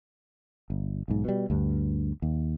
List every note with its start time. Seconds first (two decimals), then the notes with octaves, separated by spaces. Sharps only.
0.70 G1
1.08 B1 G#2
1.25 B2 G3
1.50 D2 G2
2.22 D#2